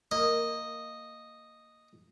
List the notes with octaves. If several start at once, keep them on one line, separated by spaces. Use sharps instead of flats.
A#3 D#5